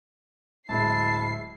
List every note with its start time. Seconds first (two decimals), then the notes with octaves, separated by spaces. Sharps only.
0.69 D1 G#3 E4 A5 C7